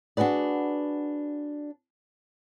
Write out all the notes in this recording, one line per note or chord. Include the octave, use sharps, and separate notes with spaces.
D4 F#4 G#4 B4 D5